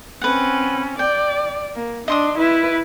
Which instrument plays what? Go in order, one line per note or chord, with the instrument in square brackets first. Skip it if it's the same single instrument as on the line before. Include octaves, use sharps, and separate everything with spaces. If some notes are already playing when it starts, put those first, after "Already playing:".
[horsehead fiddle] C4 C#4 [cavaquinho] B4 F#5
[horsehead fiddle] D5 [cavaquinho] G5
[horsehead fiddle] A#3
[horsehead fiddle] D4 [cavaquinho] D#5 C6 D#6
[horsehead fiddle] E4 B4